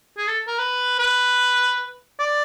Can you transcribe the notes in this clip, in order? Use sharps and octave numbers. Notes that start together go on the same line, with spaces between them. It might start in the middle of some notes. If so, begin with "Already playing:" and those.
G#4
A4
A#4
B4
B4
D5